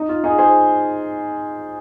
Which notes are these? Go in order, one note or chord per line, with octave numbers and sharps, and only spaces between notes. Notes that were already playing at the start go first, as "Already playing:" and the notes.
Already playing: D#4
F4
D#4 G#4
G#4 C5